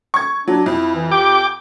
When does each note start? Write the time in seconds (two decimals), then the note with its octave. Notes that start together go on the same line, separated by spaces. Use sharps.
0.14 C#6 G#6
0.48 F#3 D4
0.66 F2 E4
0.95 E3
1.11 G4 G5 D6